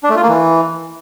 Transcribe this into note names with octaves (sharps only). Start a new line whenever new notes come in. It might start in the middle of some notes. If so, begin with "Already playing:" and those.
D4
A3
F4
A#3
E3